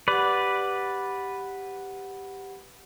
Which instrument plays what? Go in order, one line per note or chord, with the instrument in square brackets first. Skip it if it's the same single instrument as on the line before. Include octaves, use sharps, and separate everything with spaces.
[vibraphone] G4 F#5 [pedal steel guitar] B4 D5